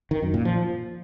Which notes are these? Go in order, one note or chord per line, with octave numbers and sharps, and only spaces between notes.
D#3
F#2
A#2
F3